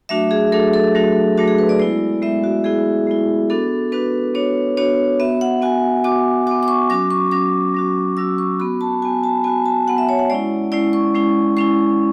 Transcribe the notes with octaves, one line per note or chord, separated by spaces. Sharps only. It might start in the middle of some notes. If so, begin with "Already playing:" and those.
F#3 A3 D4 F#4 E5
G#4
F#3 A3 D4 F#4 A4
A4
F#3 A3 D4 F#4
F#3 A3 D4 F#4
G#4
B4
D5
G#3 B3 E4 D5
G#3 B3 E4 E5
F#4
G#3 B3 E4 G#4
G#3 B3 E4
B3 D4 F#4 A4
B3 D4 F#4 B4
B3 D4 F#4 C#5
B3 D4 F#4 C#5
B3 F#4 E5
F#5
B3 F#4 G#5
B3 F#4 D6
B3 F#4 D6
D6
C#6
F#3 C#4 F#4 D6
C#6
F#3 C#4 F#4 D6
F#3 C#4 F#4
F#3 C#4 F#4 E6
C#6
B3 F#4 B5
A5
B3 F#4 G#5
A5
B3 F#4 G#5
A5
B3 F#4 F#5
E5
C#5
F#5
G#3 C#4 E4 D5
G#3 C#4 E4 D5
C#6
G#3 C#4 E4
G#3 C#4 E4 C#6